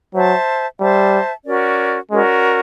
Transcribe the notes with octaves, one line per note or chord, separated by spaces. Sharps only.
F#3 C5 E5 A5
G3 C5 E5 A5
C#4 F#4 A#4 D5
G#3 C#4 F#4 A#4 D5